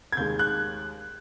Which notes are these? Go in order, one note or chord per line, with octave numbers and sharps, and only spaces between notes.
G#6
D#2 D#3 G#3 G6
F#6